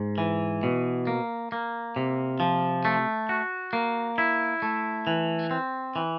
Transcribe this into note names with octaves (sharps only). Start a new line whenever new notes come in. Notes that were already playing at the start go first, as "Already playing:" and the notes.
Already playing: G#2
E3
B2
A#3
A#3
C3
F3
A3
F#4
A#3
E4
A3
E3
C4
E3